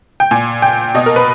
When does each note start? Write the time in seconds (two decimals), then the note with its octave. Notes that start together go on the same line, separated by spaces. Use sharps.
0.20 G5
0.31 A#2 G#5
0.62 G5
0.95 B2 D#5
1.06 A#4
1.16 B4